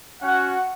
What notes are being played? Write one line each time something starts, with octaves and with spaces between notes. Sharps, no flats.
C#4 F#4 F#5